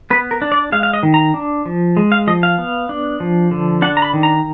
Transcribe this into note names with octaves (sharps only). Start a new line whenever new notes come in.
B3 B4
A#4
D4
D5
G#3 F5
F5
D#5
D#3
A#5
D4
F3
G#3
F5
F3 D#5
F5
B3
D4
F3
D3
D4 F#5
A#5
B5
D#3
A#5